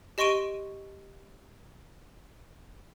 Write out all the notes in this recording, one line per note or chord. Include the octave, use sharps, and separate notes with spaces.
G4 D#5 C6 C#6 D7 D#7